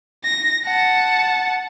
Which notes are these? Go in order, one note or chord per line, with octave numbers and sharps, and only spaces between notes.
A#6
F#5 A5